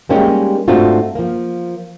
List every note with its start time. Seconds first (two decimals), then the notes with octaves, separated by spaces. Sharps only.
0.09 G3 G#3 A#3 C#4 D#4 G4
0.68 G#2 A3 C4 D4 F4 F#4
1.15 F3 A#3